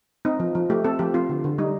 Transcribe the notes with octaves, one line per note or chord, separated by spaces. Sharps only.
C4 D#4
F3
F3
A3 G4
C4 A4
F3 G4
C4 F4
D3
D3
G3 D#4